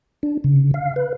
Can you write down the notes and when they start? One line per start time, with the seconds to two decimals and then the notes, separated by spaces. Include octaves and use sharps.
0.23 D4
0.44 C#3
0.74 F5
0.96 B4